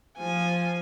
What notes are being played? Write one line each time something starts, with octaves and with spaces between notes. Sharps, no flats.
F3 G#5